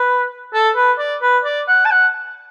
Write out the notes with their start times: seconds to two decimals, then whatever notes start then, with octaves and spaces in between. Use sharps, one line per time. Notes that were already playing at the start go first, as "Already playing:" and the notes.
Already playing: B4
0.54 A4
0.76 B4
0.98 D5
1.22 B4
1.45 D5
1.68 F#5
1.85 A5
1.91 F#5